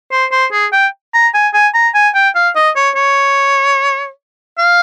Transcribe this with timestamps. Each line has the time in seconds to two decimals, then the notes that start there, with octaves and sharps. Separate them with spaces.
0.12 C5
0.32 C5
0.52 G#4
0.73 G5
1.14 A#5
1.34 G#5
1.54 G#5
1.74 A#5
1.95 G#5
2.15 G5
2.35 F5
2.56 D#5
2.76 C#5
2.96 C#5
4.58 F5